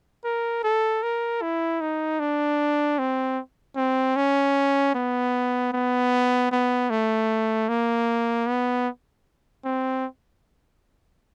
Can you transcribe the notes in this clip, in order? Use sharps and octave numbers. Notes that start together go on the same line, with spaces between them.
A#4
A4
A#4
E4
D#4
D4
C4
C4
C#4
B3
B3
B3
A3
A#3
B3
C4